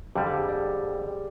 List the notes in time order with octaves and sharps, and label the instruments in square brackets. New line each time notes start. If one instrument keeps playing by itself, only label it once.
[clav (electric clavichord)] F2 D3 G3 [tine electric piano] G4
[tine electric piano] G4
G#4
D5